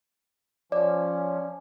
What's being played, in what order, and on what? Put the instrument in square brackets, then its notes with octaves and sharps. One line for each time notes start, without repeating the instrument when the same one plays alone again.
[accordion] F3 C#4 [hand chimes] D5